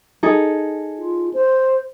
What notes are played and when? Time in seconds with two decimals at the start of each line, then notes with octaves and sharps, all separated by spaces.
0.23 D#4 G#4 A4
0.99 F4
1.34 C5